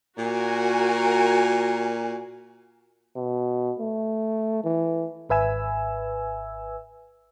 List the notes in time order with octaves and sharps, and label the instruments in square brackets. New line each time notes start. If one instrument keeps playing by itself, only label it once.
[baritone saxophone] A#2 [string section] F#4 A#4 G#5
[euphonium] B2
A3
E3
[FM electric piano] G#1 B4 E5 G#5 E6